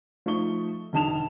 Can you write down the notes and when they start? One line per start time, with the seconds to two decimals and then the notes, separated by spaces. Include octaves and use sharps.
0.26 F3 A3 D#4 C#6 G7
0.93 E1 D3 D#4 A5 E7 F7